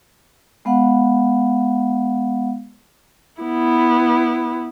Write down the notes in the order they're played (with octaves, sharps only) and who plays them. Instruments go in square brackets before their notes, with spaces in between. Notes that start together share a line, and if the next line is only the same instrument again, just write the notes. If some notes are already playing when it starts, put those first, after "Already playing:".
[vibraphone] G#3 B3 F5 F#5
[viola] B3 E4